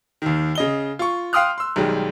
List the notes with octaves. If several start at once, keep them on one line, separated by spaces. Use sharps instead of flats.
D#2 D#3
C#3 D#5 G7
F4 C#6
F5 G5 C6 D#6 F6 F#6
C6 E6
B1 D#3 G3 G#3